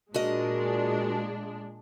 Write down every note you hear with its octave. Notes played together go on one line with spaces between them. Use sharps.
A#2 G#3 D4 F#4 A#4 D#5